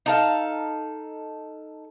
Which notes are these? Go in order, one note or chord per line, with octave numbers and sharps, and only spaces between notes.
D#4 A4 F5